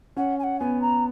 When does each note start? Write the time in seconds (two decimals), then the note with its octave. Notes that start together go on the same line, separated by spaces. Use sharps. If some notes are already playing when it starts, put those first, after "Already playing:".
0.16 C#4 F#5
0.39 G#5
0.43 F#5
0.59 B3 G#5
0.81 A#5